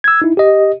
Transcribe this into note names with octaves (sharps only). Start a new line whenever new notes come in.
E6 G#6
D#4 E4
G4 D#5